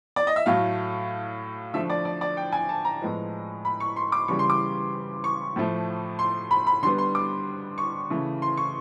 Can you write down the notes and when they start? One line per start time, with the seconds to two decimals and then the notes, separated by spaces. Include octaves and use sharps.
0.16 D5
0.27 D#5
0.36 E5
0.46 A2 F#3 A3 F5
1.74 D3 F3 A3 E5
1.90 D5
2.05 D5
2.21 D5
2.37 G5
2.52 G#5
2.69 A5
2.85 A#5
3.01 A2 F3 G#3 B3
3.65 B5
3.80 C#6
3.96 C6
4.12 D6
4.28 C#3 E3 G3 C#6
4.39 C6
4.50 D6
5.24 C#6
5.56 A2 F3 A3
6.19 C6
6.51 B5
6.67 B5
6.83 D3 G3 B3 C6
6.98 C6
7.15 D6
7.78 C#6
8.10 C#3 E3 A3
8.42 C6
8.57 C#6